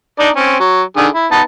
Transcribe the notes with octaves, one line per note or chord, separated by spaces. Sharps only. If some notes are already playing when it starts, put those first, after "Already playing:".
D4 D#4 D5
C4 C#4
F#3
D3 D#3 G#4
E4
B3 D#4 A5